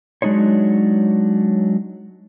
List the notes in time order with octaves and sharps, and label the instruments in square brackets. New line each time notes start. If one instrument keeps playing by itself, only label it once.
[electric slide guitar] F#3 G#3 D4 D#4 C5 C#5